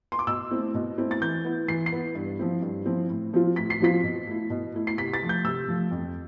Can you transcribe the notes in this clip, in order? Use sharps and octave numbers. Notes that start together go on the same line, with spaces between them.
C6
D6
B2 E6
A3 C4 E4
B2
A3 C4 E4
A6
E3 G6
B3 E4
E3 C7
C7
B3 E4
G2
F3 C4 E4
G2
F3 C4 E4
A2
F3 C4 F4
A2 B6
C7
F3 C4 F4 B6
B2
A3 E4
B2
A3 E4
C7
C3 B6
A6
F3 A3
G6
C3 E6
F3 A3
F2